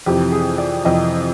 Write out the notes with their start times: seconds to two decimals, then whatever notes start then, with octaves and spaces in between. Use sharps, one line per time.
0.06 F2 C3 E3 G4
0.32 G#4
0.58 D5
0.84 F2 C3 E3 D#5